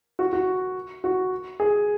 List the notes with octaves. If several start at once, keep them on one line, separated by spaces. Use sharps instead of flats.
F#4
F#4
F#4
G#4